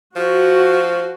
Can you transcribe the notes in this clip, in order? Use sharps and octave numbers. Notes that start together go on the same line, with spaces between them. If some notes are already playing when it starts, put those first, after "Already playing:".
F3 F#4